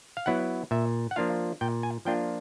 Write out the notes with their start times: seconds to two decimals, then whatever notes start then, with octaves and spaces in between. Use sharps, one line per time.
0.17 F5
0.26 F#3 B3 E4 F#5
0.71 A#2 E5
1.11 F#5
1.16 F3 A#3 D4 F4 F5
1.61 A#2 G5
1.83 G#5
2.05 F3 A#3 D4 F4 G5